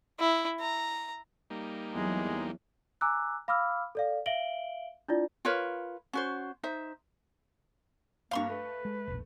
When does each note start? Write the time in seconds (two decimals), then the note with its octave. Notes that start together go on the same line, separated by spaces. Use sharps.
0.20 E4
0.61 A#5
1.50 G3 A#3 D#4
1.95 E2 F#3 G#3
3.01 G#5 A#5 D6 E6 F#6
3.48 F5 B5 D6 E6 F6
3.95 A4 D5 F5
4.26 E5 F5 D7 F#7 G7
5.08 D4 E4 F4 D5
5.45 F4 A#4 B4 C#5
6.13 C#4 F#4 C5
6.63 D#4 C5 E5
8.31 G2 A#3 F5 C6 C#6 C#7
8.49 A3 B4
8.85 G#3
9.08 E1 A#1